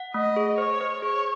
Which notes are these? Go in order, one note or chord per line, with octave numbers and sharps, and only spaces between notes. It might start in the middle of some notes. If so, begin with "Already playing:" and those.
Already playing: F#5
A3 D#5
G#4
C5 C#5
C5
G#4 C#5